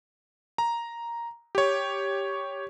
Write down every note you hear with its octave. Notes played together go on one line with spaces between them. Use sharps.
A#5
G4 C#5